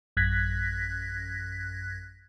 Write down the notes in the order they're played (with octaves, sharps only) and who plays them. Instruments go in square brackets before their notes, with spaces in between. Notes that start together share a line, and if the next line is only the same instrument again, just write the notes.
[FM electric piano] A1 F#2 F#6 G#6 A#6 B6